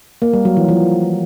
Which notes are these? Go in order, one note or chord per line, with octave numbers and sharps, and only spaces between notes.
A#3
G3
F#3
E3
F3